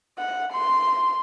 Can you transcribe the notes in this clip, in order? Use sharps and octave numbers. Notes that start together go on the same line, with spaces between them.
F#5
C6